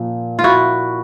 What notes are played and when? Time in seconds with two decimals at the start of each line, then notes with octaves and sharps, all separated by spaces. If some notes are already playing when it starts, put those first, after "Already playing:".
Already playing: A#2 F3
0.39 F4
0.44 E4 F#4